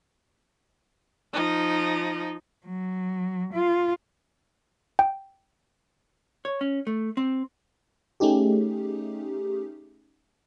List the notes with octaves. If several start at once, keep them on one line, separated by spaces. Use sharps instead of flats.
F3 D#4
F#3
F4
G5
C#5
C#4
A3
C4
A3 C#4 D#4 G4 G#4